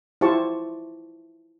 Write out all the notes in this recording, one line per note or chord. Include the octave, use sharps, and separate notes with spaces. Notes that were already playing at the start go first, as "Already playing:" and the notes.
E4 F4 G4 C5 A5 C#6